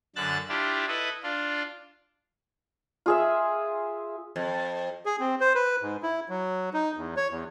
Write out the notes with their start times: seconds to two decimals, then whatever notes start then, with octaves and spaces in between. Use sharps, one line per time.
0.16 F#2 D3 E6 F#6 A6
0.49 D4 E4 F4 G4
0.88 E4 A4 B4 D#5 B5
1.23 D4 F4
3.06 F4 G#4 E5
4.36 F2
5.06 G#4
5.20 C4
5.41 C5
5.55 B4
5.82 G#2
6.03 E4
6.29 F#3
6.73 D#4
6.97 E2
7.17 C#5
7.30 E2